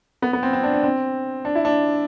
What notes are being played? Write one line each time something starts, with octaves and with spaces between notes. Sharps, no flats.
B3
B3
C4
C4
D4
D4
C4
D4
E4
D4